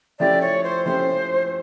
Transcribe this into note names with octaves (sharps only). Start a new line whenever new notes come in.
F3 A3 C#4 E4 G4 D5
C#5
C5
F3 A3 C#4 E4 G4 C5